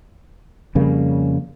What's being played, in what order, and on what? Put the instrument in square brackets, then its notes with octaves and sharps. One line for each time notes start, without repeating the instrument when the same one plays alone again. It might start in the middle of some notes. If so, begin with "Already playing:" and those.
[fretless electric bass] F2 C#3 G3 A#3